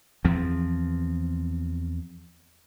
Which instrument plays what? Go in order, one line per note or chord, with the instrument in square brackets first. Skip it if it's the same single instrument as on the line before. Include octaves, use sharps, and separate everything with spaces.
[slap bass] E2 F3 C4